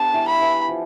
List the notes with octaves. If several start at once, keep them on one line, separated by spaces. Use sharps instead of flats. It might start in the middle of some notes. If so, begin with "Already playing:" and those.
Already playing: B3 D4 G4 A5
E3
B5
E3
F3